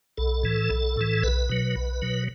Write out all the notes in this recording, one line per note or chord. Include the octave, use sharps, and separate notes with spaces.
B1 A4
A2 E3
B1
A2 E3
B1 B4
B2 F#3
B1
B2 F#3